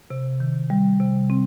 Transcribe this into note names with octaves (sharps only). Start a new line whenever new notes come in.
C3
D#3
G3
C3
C4